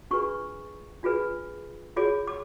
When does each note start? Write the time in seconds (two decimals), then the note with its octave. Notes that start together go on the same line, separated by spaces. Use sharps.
0.11 D4 F4 G#4 B4 C#6
1.03 D4 F4 G#4 B4
1.96 F4 G#4 C#5 D6
2.27 D6